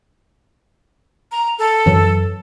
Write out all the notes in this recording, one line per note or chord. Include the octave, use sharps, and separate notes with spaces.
A#5
A4
F#2 E3 F#3